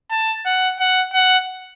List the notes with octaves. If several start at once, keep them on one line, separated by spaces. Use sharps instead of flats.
A5
F#5
F#5
F#5